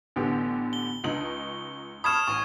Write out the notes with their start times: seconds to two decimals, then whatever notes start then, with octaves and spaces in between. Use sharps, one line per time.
0.16 A1 D3 B3 G4
0.73 G7
1.04 C#2 D4 D#4 F#7
1.24 C#6
2.04 A5 B5 C#6 D#6 F6 G#6 E7
2.27 A1 C#6